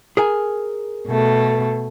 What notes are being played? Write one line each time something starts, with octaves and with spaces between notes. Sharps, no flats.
G#4 A#4 G#5
B2 A3